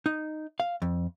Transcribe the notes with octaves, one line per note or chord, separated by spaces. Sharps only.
D#4
F5
F2